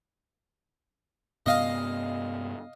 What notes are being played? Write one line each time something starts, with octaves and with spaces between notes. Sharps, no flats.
G2 C3 B3 D#5 F5